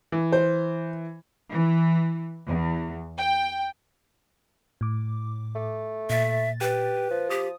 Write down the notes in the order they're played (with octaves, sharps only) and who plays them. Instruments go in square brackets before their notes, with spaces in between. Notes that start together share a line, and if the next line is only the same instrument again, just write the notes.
[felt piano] E3
[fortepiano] C5
[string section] E3
E2
G5
[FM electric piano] A2 D6
[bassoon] A3
[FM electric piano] A#2 A6 [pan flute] E5
[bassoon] G4 [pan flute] B4
[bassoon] F3
[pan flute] G4 [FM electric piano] D#6